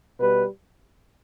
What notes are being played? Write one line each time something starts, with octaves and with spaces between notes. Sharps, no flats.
B2 G3 B4